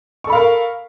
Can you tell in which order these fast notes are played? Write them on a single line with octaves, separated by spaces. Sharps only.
C#6 A4 B5 F5 A#4